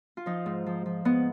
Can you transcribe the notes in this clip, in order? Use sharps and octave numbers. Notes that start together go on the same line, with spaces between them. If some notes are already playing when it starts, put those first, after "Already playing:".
F4
F3 D#4
G#2
F3
F3
G#2 B3